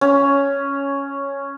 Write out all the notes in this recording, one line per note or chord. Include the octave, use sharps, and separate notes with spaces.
C#4